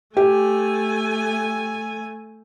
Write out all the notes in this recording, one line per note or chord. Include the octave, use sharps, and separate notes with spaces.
A3 G4 G#5